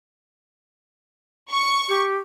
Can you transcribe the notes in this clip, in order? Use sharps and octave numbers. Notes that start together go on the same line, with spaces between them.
C#6
G4